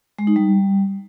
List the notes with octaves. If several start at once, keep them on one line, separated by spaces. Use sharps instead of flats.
G#3
D#4
G3